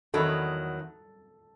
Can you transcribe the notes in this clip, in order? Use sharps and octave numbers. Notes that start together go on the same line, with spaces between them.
E2 D#3 F#3 A4